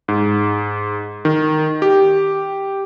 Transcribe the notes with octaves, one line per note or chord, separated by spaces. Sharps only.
G#2
D#3
G4